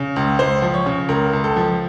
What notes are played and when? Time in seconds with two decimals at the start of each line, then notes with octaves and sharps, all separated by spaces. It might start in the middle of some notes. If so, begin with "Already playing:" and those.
Already playing: C#3
0.16 C#2
0.39 C#2 C5
0.62 F3
0.74 C#5
0.86 C#3
1.09 C#2 A#4
1.33 C#2
1.44 A4
1.56 F3